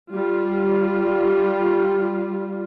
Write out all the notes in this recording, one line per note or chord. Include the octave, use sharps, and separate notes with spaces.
G3 F4